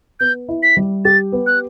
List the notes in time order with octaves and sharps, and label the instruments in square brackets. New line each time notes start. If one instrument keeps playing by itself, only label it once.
[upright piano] B3 [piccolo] G6
[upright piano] E4
[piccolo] B6
[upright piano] G3
[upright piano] G4 [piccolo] A6
[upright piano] B3
[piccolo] F#6